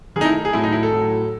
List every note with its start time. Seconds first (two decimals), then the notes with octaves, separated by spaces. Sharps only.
0.16 D#3 G#4
0.20 A3 D#4
0.25 E4
0.45 G#4
0.53 A2 F#3 A3 E4
0.63 D#4
0.72 E4
0.83 A4
0.92 A2 F#3 A3